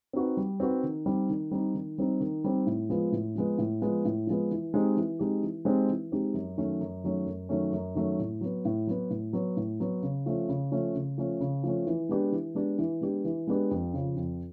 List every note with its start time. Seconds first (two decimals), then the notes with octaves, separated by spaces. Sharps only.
0.13 C4 D#4 F#4 B4
0.37 G3
0.60 C4 D#4 F#4 B4
0.83 D#3
1.06 G3 C4 D#4
1.29 D#3
1.51 G3 C4 D#4
1.74 D#3
1.98 G3 C4 D#4
2.20 D#3
2.44 G3 C4 D#4
2.67 A2
2.90 F3 G#3 B3
3.12 A2
3.35 F3 G#3 B3
3.58 A2
3.82 F3 G#3 B3
4.05 A2
4.27 F3 G#3 B3
4.51 E3
4.74 G#3 C4 D#4 G4
4.97 E3
5.19 G#3 C4 D#4 G4
5.43 E3
5.65 G#3 C4 D#4 G4
5.89 E3
6.12 G#3 C4 D#4 G4
6.34 F#2
6.58 D#3 F#3 A3 C#4
6.81 F#2
7.04 D#3 F#3 A3 C#4
7.26 F#2
7.49 D#3 F#3 A3 C#4
7.72 F#2
7.95 D#3 F#3 A3 C#4
8.19 A2
8.41 F#3 B3
8.65 A2
8.87 F#3 B3
9.10 A2
9.33 F#3 B3
9.57 A2
9.80 F#3 B3
10.03 C#3
10.26 F3 A3 C#4
10.49 C#3
10.72 F3 A3 C#4
10.95 C#3
11.18 F3 A3 C#4
11.41 C#3
11.64 F3 A3 C#4
11.87 E3
12.09 G#3 B3 D4 G4
12.32 E3
12.55 G#3 B3 D4 G4
12.79 E3
13.01 G#3 B3 D4 G4
13.25 E3
13.47 G#3 B3 D4 G4
13.71 F2
13.94 C#3 F3
14.16 F2